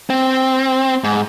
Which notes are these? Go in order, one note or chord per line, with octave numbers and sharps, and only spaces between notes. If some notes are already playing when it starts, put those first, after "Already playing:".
C4
G#2